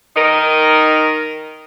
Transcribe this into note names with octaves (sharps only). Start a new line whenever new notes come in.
D#3 D#4 A#4